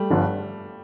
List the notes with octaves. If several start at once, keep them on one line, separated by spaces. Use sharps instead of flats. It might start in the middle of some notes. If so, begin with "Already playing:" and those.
Already playing: G3 A3
G1 G2 D3 F3